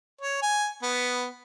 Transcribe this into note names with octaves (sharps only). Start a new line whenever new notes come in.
C#5
G#5
B3